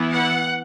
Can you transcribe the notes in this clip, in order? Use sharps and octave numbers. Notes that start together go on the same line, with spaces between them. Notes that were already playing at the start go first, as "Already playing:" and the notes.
Already playing: E3 B3 E4
F#5